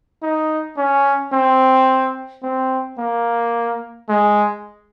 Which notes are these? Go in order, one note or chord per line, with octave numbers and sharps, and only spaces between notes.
D#4
C#4
C4
C4
A#3
G#3